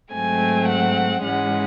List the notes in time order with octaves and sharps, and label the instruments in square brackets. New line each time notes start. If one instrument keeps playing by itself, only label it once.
[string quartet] G#2 F#3 A3 C4 G#5
F#5
G#2 E3 G#3 C#4 F#5